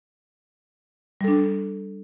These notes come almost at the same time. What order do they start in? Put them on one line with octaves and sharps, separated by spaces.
G3 A4 D4